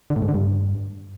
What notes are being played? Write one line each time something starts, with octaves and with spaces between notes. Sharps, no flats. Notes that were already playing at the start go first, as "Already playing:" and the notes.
D3
A2
G#2
D3
G2